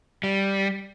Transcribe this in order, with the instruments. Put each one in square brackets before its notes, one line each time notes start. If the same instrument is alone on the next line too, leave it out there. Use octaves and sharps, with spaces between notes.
[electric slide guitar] G3